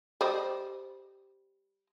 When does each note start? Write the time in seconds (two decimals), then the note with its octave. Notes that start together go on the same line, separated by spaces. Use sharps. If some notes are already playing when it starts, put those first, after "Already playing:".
0.21 G3 C5 D#5